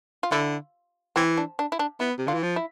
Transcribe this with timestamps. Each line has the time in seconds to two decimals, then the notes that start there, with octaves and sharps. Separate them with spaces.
0.23 F4
0.32 D3 E4
1.16 E3 C4
1.37 D4
1.59 D4
1.72 E4
1.79 D4
2.00 B3 E4
2.18 C3
2.27 D3 F4
2.34 E3
2.43 F3
2.56 E4